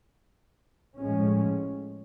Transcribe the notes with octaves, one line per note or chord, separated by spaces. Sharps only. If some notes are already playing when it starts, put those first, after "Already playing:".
A2 F3 G#3 C#4